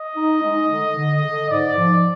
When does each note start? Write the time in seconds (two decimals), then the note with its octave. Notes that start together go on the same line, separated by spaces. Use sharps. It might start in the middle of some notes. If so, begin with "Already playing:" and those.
Already playing: D#5
0.16 D#4
0.42 G#3
0.70 D3
0.96 D3
1.24 D3
1.50 G#2 D5
1.78 F3